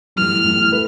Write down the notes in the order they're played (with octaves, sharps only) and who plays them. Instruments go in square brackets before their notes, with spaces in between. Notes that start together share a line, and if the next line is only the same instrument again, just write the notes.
[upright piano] A2 E3 G3 [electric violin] F6
[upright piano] A2 E3 G3
A3 B4